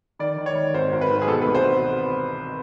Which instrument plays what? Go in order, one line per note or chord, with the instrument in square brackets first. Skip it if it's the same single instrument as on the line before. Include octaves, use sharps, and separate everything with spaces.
[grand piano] D#3 D5
D#3
C#5
D#3
G#1 C5
G#1
B4
D#3
G#4
B2 A4
B4
C2
C5
B2